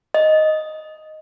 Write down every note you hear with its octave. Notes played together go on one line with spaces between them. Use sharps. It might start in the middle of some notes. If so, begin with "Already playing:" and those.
D#5